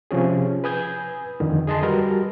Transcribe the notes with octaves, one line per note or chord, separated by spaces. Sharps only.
C3 F3 C#4 G#4
B4 G#5 D#6 G6 G#6
F2 D3 D#3
G#4 D#5 A5 C6
G3 F#4 G4 A#4 B4